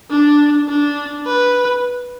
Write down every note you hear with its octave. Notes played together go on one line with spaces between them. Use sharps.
D4
D4
B4